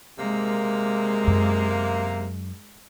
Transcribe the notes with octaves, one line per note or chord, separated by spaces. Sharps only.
C3 G#3 A#3
F#2